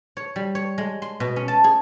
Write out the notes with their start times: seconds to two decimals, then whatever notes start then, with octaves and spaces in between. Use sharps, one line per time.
0.17 C#5
0.36 G3
0.55 C#5
0.78 G#3
1.02 C6
1.20 B2
1.36 C#4
1.48 A5
1.64 G#4